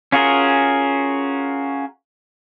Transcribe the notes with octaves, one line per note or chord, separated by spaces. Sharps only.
C#4 F4 F#4 G#4 A#4